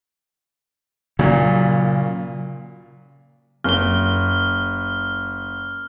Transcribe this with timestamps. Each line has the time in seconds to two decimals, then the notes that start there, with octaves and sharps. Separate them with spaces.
1.19 A#2 C#3 F#3
3.64 F#1 F6 G7